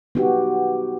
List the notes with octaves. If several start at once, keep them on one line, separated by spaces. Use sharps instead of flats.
B3 D#4 F#4 G4